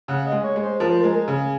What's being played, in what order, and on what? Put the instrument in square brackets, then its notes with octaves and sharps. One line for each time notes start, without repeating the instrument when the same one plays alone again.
[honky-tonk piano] C#3 [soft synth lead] F#5
[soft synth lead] D#5
[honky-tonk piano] G#3
[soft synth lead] C#5
[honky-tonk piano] G#3
[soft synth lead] C5
[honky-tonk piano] F3 [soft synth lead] A#4
[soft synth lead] C5
[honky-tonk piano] G#3 [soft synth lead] A#4
[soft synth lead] G#4
[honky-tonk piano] C#3